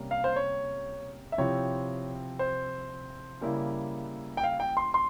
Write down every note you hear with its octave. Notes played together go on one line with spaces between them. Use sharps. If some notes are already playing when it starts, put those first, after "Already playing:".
Already playing: C3 G3 A#3 C#4
F5
C5
C#5
E5
C3 F3 C4 E4 C#5
C5
C#3 G3 A#3 E4
G5
F5
G5
C6
C6